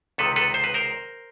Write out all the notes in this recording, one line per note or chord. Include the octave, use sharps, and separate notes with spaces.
C#2 C3 D#3 A4 B4
A4 B4
C5
B4
A#4 C5